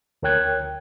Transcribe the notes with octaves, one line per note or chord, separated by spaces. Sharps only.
D2 A#4 C#5 G5 F#6 G#6